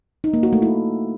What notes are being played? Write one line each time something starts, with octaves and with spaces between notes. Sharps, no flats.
D#4
A#3
F#4
A3
E4